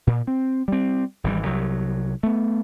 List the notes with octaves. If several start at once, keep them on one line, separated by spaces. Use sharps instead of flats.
A#2
C4
G3 C4
G#1 E3 G3
C2 F#3
A3 B3